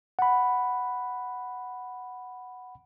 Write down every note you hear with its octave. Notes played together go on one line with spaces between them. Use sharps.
F#5 B5